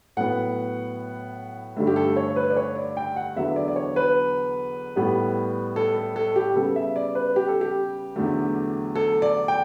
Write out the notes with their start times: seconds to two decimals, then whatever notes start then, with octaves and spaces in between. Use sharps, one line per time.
0.17 A2 F#3 B3 F#5
1.76 G2 D3 A3
1.87 G4
1.96 A4
2.17 C#5
2.36 B4
2.50 D5
2.57 C#5
2.76 D5
2.97 G5
3.16 F#5
3.36 E2 D3 F#3 B3 E5
3.56 D5
3.68 D5
3.76 C#5
3.96 B4
4.96 A2 G3 B3
5.76 A4
5.96 A4
6.16 A4
6.36 G4
6.56 C#3 G3 B3 A4
6.76 E5
6.96 D5
7.15 B4
7.36 G4
7.48 A4
7.61 G4
8.16 E2 D3 F#3 A3
8.95 A4
9.22 D5
9.48 G5